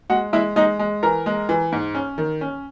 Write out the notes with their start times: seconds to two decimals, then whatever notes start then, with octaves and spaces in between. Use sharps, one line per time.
0.10 G#3 F#4 F#5
0.33 G#3 E4 E5
0.56 G#3 D#4 D#5
0.79 G#3
1.03 E3 A#4 A#5
1.26 G#3
1.49 E3
1.72 G#2
1.95 C#4
2.18 D#3
2.41 C#4